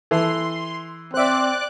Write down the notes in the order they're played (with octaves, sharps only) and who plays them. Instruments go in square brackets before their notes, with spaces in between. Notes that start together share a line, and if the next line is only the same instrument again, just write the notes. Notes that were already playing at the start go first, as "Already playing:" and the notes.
[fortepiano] E3 [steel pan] A4 [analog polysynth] C6
[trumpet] C4 [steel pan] C5 E5 [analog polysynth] D5 D6 F#6